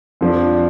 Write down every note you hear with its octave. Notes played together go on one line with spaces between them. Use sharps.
F2 F3 D4